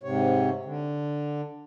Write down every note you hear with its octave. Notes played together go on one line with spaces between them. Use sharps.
G#2 C3 C#5
D3